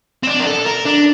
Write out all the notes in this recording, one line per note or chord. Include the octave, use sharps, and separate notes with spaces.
C4
D4
A#4
A4
A#4
D4